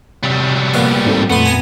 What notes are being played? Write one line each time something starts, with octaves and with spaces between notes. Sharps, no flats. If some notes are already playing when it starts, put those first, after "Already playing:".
C3 F#3 G3
A#1 B3 F5
G#2 C4 A4
F2 A#2 A3 B3 C6
G#5 A#5